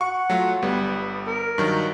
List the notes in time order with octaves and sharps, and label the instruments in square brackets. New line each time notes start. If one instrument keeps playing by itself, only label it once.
[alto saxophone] F#5 [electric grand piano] C#6
[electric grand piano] F#3 A3 F4
[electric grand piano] G1 G3 [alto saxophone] B3
[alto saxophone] A#4
[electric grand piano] G2 D#3 F#3